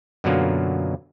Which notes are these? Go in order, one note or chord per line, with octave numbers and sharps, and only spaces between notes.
F#2 B2 D3 F#3 A#3 F4